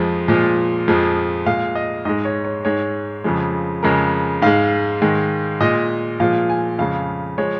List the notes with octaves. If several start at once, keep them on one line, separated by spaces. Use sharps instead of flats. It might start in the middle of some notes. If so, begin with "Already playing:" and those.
Already playing: F2 F3 G#3
A#2 F3 G#3
F2 F3 G#3
A#2 G#3 F5
D#5
G#2 G#3 D#5
C#5
C#5
G#2 G#3 C#5
F2 C#3 F3 G#3
F2 C#3 G#3 A#4
G#2 G#3 F5
G#2 D#3 G#3
A#2 G#3 D#5
A#2 F3 G#3 F5
G#5
F2 C#3 G#3 F5
F3 G#3 C#5